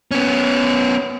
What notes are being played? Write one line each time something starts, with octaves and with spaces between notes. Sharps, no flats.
B3 C#4